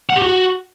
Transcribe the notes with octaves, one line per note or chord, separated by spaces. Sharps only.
F#5
G4
F#4